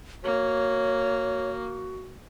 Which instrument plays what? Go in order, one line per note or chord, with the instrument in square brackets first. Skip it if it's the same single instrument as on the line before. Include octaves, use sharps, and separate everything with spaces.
[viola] A#3 [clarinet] F#4 [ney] C#5